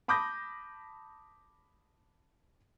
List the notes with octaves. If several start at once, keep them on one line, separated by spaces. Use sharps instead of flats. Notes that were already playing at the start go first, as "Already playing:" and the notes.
A5 B5 D6 D#6 G6 A#6